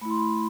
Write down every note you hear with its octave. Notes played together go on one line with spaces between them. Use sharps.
A3 E4 B5
C6
B5
C6